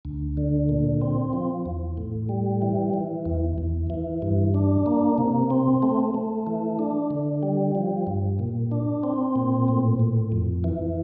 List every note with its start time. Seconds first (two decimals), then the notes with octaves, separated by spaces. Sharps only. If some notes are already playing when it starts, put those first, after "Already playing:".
0.05 D2
0.37 D3
0.69 A#2
1.02 C4
1.33 F3
1.66 E2
1.97 A2
2.29 G3
2.62 E3
2.94 E3
3.25 E2
3.58 E2
3.90 E3
4.22 G2
4.54 D4
4.86 A#3
5.18 C3
5.50 C4
5.83 A3
6.14 A3
6.47 E3
6.79 D4
7.11 D3
7.43 G3
7.75 F3
8.07 G2
8.39 A#2
8.71 D4
9.03 C4
9.36 A#2
9.68 A2
9.99 A2
10.32 F2
10.64 E3